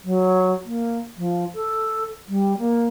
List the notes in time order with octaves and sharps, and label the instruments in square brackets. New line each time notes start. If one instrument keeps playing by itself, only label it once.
[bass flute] F#3
A#3
F3
A4
G3
A#3